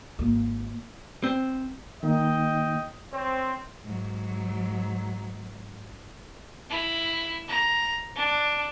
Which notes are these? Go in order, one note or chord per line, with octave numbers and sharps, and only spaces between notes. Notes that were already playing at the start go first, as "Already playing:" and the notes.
G#1 A#3
C4
D#3 A#3 D#4 D#5 G5
C4 C#5
G#2 F#3
E4
A#5
D4